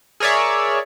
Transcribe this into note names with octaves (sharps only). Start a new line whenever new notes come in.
G#4 A#4 C#5 D5 E5